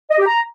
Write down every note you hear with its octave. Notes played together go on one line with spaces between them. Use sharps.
D#5
G4
A#5